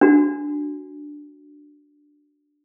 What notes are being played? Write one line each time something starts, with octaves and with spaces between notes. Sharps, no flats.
D4 F#4